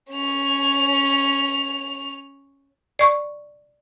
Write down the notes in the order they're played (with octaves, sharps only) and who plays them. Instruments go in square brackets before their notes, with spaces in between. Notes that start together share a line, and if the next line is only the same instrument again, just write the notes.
[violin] C#4 F7
[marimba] D5 C#6